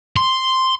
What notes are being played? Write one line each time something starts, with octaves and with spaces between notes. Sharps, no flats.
C6